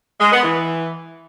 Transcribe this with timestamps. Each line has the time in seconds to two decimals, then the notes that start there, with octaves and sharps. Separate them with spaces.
0.20 G#3
0.32 B3
0.43 E3